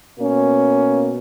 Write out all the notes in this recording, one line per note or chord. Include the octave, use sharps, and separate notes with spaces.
B2 A#3 C#4